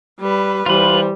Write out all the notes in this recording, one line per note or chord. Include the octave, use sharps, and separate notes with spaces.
G3 B4
E3 G3 F4 B4 C5